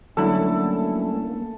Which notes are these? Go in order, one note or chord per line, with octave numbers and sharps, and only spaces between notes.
D3 F#3 G3 A3 A#3 C#4 E4 A4